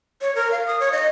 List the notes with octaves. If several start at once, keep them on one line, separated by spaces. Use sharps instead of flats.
C#5
A#4
F5
D#6
C#5
D#5